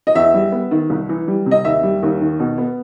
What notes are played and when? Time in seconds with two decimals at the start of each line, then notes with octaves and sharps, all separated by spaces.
0.07 D#5
0.15 E2 E5
0.34 G3
0.52 B3
0.71 D#3
0.90 C2
1.09 E3
1.28 G3
1.46 C3
1.51 D#5
1.65 D#2 E5
1.83 G3
2.03 D#2
2.21 D#3
2.40 B2
2.58 B3